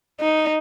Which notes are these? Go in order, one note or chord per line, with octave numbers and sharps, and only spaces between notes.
D#4